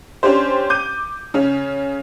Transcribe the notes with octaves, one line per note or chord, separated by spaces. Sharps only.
C#4 D4 G4 C5
D6 G6 D#7
C#3 C#4